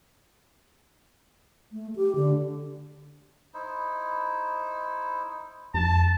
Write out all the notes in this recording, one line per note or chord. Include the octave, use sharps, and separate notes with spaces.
A3
G4
D3
D#4 E4 C5
F2 A5